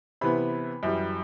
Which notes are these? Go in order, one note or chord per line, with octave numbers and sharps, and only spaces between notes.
C3 E3 B3 B5
F#2 E3 G3